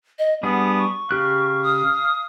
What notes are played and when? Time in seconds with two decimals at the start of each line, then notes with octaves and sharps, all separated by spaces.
0.19 D#5
0.43 G3 B3 D4 G#4 F#5
0.78 C#6
1.11 C#3 G4 F5 F#6
1.63 D#6